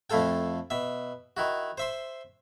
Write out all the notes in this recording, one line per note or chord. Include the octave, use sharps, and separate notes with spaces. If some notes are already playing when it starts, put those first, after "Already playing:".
F2 A3 E4 F4 A4 G5
B2 E5
D#3 E4 F#4
C5 E5 C6